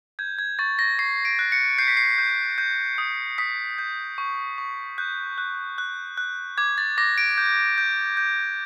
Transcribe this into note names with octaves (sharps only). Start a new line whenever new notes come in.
G6 G#6
G#6
C#6 A6
A#6
C#6 C7
D7
F#6
C#7
G6 C7
B6
C7
G6
G6
D#6
D#6 B6
G6
C#6
C#6
F#6 G6
F#6
F#6
F#6
D6 G#6
A6
D6 A#6
D7
G6
G6
G6